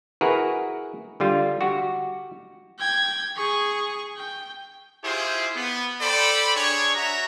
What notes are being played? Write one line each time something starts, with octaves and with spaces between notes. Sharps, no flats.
E4 F#4 G#4 A#4 B4
D3 G3 F4
F#4 G4
G5 G#6
G#4 C#6
G5
E4 F4 G4 G#4 C5
B3
A4 C5 D5 G5 B5
D4 G#4 C#5
F#4 E5 A#5